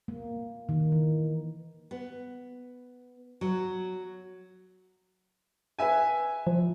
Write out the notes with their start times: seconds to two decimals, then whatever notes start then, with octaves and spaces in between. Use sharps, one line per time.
0.08 A#3
0.69 D#3
0.92 E3
1.91 B3
3.41 F#3
5.79 B4 E5 G#5
6.47 F3